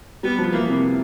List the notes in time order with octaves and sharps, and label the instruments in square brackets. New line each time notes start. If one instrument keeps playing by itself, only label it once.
[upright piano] G3 [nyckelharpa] B3
[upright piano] F3
[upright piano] E3 [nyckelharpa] A#3
[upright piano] C3